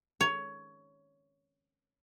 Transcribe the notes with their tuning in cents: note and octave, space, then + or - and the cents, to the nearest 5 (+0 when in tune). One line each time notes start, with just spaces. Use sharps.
C#5 +15